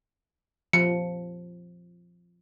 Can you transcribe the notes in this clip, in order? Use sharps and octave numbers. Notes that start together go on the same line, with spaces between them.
F3 C#7